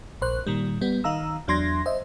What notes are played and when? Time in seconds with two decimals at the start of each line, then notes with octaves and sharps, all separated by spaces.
0.22 A#1 C5 F#6
0.47 A#2 D#3 G3
0.81 G3 B3
1.04 D#3 D#4 F5 A#5 E6
1.48 E2 F#3 D4 C6 G#6 A#6
1.86 C5 D#5 E5